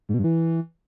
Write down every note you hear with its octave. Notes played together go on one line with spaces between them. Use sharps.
G#2
B2
G2
E3